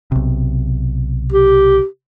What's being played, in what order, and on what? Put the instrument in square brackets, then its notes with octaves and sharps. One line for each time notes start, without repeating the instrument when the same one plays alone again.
[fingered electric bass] B1 C3
[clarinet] G4